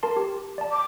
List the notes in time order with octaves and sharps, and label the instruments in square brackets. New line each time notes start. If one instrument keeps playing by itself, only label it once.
[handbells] A#4 A5 C6
G4
D5 A5
[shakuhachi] D6